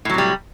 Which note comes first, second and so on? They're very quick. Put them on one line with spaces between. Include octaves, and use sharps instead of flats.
A2 F#3 C3 G3